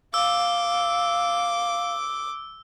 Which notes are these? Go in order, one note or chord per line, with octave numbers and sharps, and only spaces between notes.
F5 D6 E6